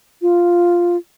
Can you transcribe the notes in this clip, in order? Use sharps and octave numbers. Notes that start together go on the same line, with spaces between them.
F4